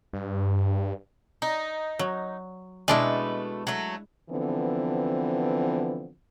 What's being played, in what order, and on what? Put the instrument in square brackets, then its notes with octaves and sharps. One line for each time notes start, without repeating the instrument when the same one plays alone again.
[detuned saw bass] G2
[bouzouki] D#4
[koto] F#3
[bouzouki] B2 A3 B4 [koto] G#3 D4 E4
[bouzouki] F#3 A3
[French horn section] D3 E3 F3 B3 C4